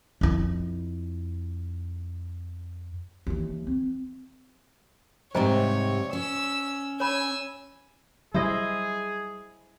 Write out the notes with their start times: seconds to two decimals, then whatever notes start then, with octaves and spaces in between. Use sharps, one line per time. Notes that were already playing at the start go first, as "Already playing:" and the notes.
0.21 F2 E4
3.27 D#2 E3
3.67 C4
5.35 G#2 C3 G3 C5 C#5 D#5 A#5
6.13 C#4 E6
7.00 C#5 G#5 B5 E6
8.34 F#3 G3 E4 G#4 C5 D#5